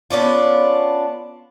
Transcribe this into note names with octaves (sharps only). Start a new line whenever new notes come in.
B3 C#4 D4 F4